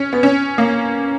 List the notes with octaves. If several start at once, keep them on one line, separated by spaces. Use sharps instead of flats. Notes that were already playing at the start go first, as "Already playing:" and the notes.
Already playing: C#4
B3
C#4
A#3